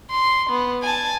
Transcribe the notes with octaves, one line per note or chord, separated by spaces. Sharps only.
C6
B3
G#5 A5